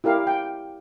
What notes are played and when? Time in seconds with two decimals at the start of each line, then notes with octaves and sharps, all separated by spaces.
0.04 E4 G4 A#4 F5
0.27 G5